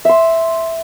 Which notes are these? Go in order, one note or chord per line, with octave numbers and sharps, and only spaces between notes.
E5 C6